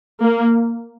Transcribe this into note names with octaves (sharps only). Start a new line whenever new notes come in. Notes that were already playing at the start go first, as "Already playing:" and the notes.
A#3